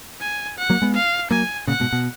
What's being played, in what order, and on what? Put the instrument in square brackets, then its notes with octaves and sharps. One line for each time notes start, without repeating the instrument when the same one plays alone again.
[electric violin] G#5
F#5
[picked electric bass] F#3 A#3
G#3 B3
[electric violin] F5
[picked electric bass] F#3 A#3 [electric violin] G#5
[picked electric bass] A#2 C#3 [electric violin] F#5
[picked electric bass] G#2 B2
B2